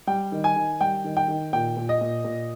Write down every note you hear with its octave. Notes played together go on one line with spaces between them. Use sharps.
G3 G5
D#3
G#5
D#3
G3 G5
D#3
G5
D#3
A#2 G5
A#2
D#5
A#2
A#2